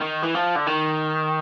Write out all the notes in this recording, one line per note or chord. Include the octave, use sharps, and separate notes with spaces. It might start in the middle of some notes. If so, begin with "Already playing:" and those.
D#3
E3
F3
D3
D#3